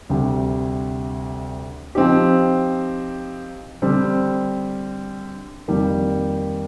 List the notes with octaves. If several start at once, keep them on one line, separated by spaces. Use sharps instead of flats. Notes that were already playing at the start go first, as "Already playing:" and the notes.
D2 C3 G3
F3 C4 D#4 G4
D3 G3 C4
F2 D#3 G3 A#3